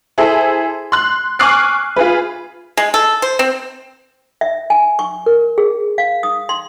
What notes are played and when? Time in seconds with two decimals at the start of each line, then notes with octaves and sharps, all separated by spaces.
0.18 E4 G#4 A4 C5
0.92 C6 F#6
1.39 G#5 C#6 D6 F6 F#6 C7
1.96 F4 G#4 B4
2.77 G#3
2.94 A4
3.22 C5
3.39 C4
4.41 E5
4.70 G#5
4.99 C#6
5.26 A#4
5.58 G#4
5.98 F5
6.23 D#6
6.49 C6